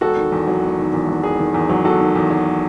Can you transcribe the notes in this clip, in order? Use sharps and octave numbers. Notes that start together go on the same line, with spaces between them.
E1 F#4 A4
D#3
E2
F#3
E1
D#3
E2
F#3
E1 G#4
D#3
E2
F#3
E1 F#4 A4
D#3
E2
F#3